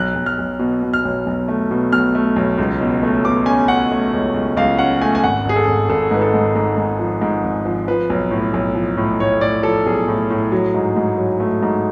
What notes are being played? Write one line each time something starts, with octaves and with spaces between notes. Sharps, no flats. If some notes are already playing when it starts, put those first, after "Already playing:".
Already playing: B1 F#6
B1
F6
B1
B2
B2
F6
B1
B1
A3
B2
B1 F6
A3
B1
C#2
B2
A3
B2 D6
C#4 G#5
C#4 F#5
A3
C#2
C#2
C#2 F5
C#4 F#5
A3 G#5
G#5
G#1 F#5
G#1 G#4
A4
G#1
G#1 A4
G#2 B4
A4
G#2
G#2
G#2
F3
G#2
G#1
F3
F3 B4
B1
A2
B1
F3
A2
A2 C#5
A2 D5
F3 A4
B1 G#4
A2
A2
F#3
G#2
G#2
F#3
A3
G#2